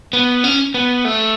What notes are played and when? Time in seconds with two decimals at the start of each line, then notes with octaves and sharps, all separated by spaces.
0.13 B3
0.44 C#4
0.74 B3
1.05 A3